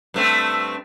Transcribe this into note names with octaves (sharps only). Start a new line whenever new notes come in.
G2 A3 C4